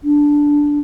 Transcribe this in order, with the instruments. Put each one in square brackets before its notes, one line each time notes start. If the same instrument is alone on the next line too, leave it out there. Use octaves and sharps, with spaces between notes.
[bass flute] D4